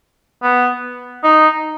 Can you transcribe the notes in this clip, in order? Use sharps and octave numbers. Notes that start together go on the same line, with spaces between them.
B3
D#4